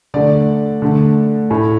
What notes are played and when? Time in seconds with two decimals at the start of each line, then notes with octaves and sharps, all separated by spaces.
0.14 D3 A3 D5
0.82 D3 A3
1.50 A2 A3